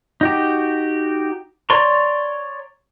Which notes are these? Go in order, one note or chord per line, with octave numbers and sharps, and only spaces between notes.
D#4 F#4 G4
C#5 D5 A#5 C6 C#6